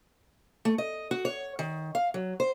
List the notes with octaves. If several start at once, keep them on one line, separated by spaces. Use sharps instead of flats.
A3
D#5
F#4
C#5
D#3
F5
F#3
C5